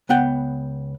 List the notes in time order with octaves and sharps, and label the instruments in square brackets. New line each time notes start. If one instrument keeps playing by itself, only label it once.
[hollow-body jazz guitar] C#2 B3 F#5 G5